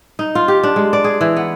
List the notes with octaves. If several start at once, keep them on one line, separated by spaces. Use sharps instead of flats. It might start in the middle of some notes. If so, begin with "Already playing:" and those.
D#4
F4
G4
D4
G#3
D5
G#4
E3
B3